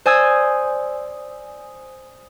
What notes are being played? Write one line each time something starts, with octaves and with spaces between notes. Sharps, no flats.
C5 D5 G#5 D#6 E6 G#6